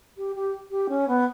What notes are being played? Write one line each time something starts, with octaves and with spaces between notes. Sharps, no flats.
G4
G4
G4
C#4
B3